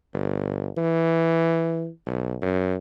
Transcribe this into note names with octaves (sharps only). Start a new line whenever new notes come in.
G1
E3
B1
F#2